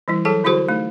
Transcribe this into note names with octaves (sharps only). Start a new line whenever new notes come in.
E3 G3 E4
F#3 G#4 A4 A5
D3 E4 F#4 G#4 C5
A3 D#4